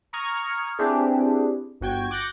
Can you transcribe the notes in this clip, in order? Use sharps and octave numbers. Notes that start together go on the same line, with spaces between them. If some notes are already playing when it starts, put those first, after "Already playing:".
A#5 C#6 D#6 F6 G#6
C4 D4 E4 G4 G#4 B4
G1 F#4 G5 G#6
D6 F#6 G6 A6 A#6 C#7